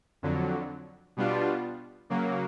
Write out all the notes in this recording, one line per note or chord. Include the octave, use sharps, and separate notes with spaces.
F2 D3 F#3
B2 G3 B3 D4 F4
C#3 F#3 A#3